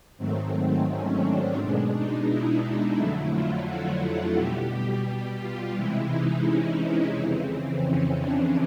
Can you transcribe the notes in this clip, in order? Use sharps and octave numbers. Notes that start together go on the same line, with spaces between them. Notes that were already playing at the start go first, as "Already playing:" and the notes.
G#2 D#3 F#3 A3 C4
C#4
D4
B2 G#3
D#4
E4
E4
F2 D3 F#3 A3
F4
F#4
B2 G3 G4
F4
C3 E3 G#3 E4
D#4
C#4
F2 C#3 E3 C4
C#4
D4